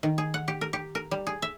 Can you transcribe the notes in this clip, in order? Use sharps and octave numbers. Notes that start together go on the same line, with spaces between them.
D#3
G#4
F#5
G4
A#4
G4
A#4
G3
G#4
E5